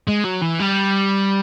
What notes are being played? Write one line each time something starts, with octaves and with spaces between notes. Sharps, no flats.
G#3
F#3
E3
G3